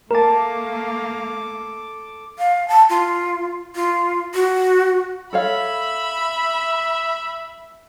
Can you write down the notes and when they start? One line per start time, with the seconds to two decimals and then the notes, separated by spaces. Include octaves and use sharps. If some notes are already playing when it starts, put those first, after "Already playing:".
0.11 A3 A#3 A4 A#4 A5 D6
2.39 F5
2.68 A5
2.90 F4
3.75 F4
4.34 F#4
5.33 A4 C#5 E5 F5 B5